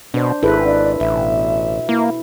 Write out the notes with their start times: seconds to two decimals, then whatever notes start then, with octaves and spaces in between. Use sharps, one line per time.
0.14 B2 D4 C5
0.43 G#1 E4 G#4 A4 B4
0.65 D4 D5
1.00 A1 E5
1.13 B2
1.89 A#3 E4